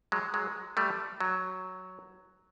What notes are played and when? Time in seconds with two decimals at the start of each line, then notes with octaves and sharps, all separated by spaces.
0.12 F#3 G#3
0.34 F#3 G#3
0.77 G3 A3
1.20 F#3